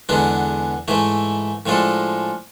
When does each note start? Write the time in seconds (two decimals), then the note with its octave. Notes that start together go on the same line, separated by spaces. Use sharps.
0.09 E2 D3 G#3 B3 D4
0.88 G#2 E3 A3 E4
1.66 A2 F3 G#3 D4 A4